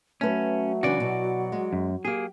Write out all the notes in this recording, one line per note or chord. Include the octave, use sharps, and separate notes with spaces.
F#3 A3 C#4 B4
C#3 E3 D4 F#4 D5
B2
G#3
F#2
A#3 G4 G#4